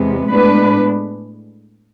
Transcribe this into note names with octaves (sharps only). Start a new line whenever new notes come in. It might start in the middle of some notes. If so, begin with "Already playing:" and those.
Already playing: E2 C3 G#3 B3
A2 G#3 B3 D4 B4